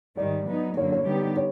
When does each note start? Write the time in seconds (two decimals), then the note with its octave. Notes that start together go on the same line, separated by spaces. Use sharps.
0.17 G#2 D#3 G3 D5
0.48 F#3 B3 D#4
0.76 F#2 D3 F#3 A#3 C#5
0.92 C#5
1.06 D3 G3 B3 D#4 G4
1.37 C#5